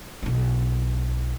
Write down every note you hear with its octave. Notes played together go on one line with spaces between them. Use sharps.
B1 E4